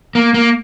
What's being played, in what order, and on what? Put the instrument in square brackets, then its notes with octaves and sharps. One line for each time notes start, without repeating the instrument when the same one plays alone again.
[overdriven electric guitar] A#3
A#3